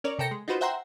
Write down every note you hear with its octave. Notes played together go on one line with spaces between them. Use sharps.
C#4 A#4 C#5 D5
C3 A4 A#4 G5 A#6 C#7
G#3
D#4 F4 F#4 B4 C5
C5 E5 F#5 G5 A#5 C6